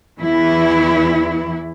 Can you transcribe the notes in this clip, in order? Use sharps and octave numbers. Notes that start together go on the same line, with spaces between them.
E2 E3 E4